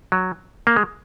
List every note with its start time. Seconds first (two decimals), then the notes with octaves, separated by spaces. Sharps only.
0.12 F#3
0.67 A#3
0.76 G#3